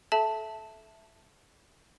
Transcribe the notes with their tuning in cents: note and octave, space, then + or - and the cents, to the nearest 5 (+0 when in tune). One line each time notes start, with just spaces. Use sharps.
A4 -25 E5 +0 A5 +0